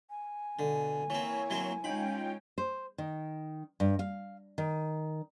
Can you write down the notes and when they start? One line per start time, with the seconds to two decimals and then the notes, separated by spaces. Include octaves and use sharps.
0.10 G#5
0.59 B2 D3
1.10 E3 A#3 C4 E4 C#5
1.50 E3 F#3 C4
1.84 G#3 C#4 D#4 F4 G5 B5
2.58 C5
2.98 D#3
3.80 G2
3.99 F5
4.58 D#3